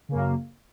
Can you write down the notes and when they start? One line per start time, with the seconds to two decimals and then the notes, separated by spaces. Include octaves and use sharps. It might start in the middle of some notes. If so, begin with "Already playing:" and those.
0.09 C#3
0.12 A#3
0.14 F#2